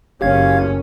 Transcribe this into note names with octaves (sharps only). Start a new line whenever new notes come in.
F#1 C#4 G4 F5 G#6